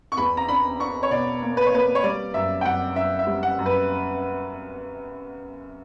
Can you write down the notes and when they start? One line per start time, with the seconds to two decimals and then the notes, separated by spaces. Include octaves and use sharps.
0.12 C#6
0.17 E2 B5
0.37 A#5
0.48 D4 B5
0.80 D4 C#6
1.03 C#5
1.11 B2 D5
1.42 A#3
1.57 B4
1.66 C#5
1.72 A#3 B4
1.95 C#5
2.03 G3 D5
2.34 F#2 E5
2.61 G5
2.65 F#2 F#5
2.96 F#2 E5
3.19 E5
3.27 G3
3.43 F#5
3.59 F#2
3.66 B4